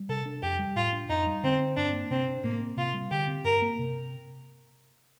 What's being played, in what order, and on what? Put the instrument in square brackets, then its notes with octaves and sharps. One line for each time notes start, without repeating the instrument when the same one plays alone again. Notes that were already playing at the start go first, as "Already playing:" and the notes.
Already playing: [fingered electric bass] G3
[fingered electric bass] C3 [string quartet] A4
[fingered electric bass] D4
[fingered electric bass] F2 [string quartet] G4
[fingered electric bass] G3
[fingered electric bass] A2 [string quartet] F4
[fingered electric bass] D4
[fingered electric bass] F2 [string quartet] D#4
[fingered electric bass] G3
[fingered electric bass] D3 [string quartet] C4
[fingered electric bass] C4
[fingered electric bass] G2 [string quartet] D4
[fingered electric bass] A#3
[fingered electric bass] C3 [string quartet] C4
[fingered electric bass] D4
[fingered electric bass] A2 [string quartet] A#3
[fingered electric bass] C4
[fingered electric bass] C3 [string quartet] F4
[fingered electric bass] G3
[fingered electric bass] D3 [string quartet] G4
[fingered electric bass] C4
[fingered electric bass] G2 [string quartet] A#4
[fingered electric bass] A#3
C3